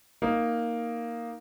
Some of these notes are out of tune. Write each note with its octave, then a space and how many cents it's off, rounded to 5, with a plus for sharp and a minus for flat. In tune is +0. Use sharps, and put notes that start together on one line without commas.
A#3 +0 D#4 +0